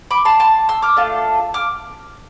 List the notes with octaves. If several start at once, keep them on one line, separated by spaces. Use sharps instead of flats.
B5 D6
A5 C6
A5 C6
C6 E6
D6 F6
A3 D4 F4 A4
D6 F6